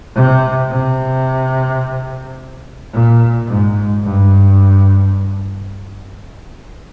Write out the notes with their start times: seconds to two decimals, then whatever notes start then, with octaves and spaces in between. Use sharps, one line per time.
0.16 C3
0.71 C3
2.93 A#2
3.48 G#2
4.04 G2